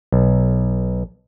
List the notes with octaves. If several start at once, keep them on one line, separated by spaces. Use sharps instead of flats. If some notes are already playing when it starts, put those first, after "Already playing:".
B1